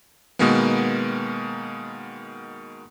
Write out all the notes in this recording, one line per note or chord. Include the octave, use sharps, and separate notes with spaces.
B2 D#3 G#3 A#3 B3